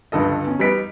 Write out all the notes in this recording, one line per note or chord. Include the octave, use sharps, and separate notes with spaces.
C#2 G2 D3 A4 D#5
C#4
G3 D#4 B4 B6 D7